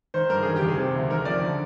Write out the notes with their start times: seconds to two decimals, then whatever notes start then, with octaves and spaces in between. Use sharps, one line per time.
0.14 D#3 C5
0.30 G2 A#4
0.43 D#3 G#4
0.56 G4
0.62 D#2
0.68 G#4
0.78 C3
0.94 D2
1.10 D#3 A#4
1.25 F2 D5
1.42 D3